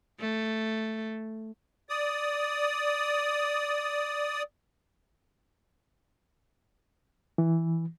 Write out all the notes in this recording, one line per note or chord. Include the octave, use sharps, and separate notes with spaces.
A3
D5 D#6
E3